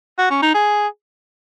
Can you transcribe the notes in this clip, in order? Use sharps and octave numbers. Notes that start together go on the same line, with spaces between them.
F#4
C#4
D#4
G#4